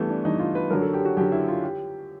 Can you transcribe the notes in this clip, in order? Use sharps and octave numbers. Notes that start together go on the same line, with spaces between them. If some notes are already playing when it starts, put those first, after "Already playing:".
Already playing: G2 E3 A3 B3
D4
G2 E3 D#4
F4
B4
F#2 D3 F#3 A#4
A4
G4
F#4
F#2 D3 F#3 G4
E4
F4
G4